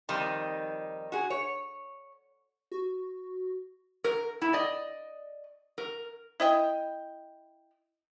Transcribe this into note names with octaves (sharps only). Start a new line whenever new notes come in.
F2 D#3 G3 D#4
F#4 G#4
C#5
F#4
A#4
E4
D5 D#5
A#4
E4 D#5 G5